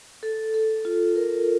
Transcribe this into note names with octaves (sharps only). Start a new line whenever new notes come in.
A4
A4
F4
A#4